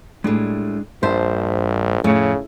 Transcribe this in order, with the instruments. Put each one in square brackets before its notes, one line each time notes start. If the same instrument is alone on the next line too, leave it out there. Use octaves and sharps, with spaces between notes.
[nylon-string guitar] A2 G3 [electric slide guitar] G#3 D4 G#4
[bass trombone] A#1 [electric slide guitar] G2 E5 A5 [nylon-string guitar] C5
[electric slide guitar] F2 C#5 [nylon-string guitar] A2 [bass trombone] C#3